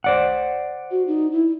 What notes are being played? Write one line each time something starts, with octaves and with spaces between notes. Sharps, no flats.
C5 D5 F#5
F#4
D#4
E4